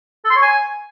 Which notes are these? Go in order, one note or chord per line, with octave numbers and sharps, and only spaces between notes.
A4
C6
C#5
G#5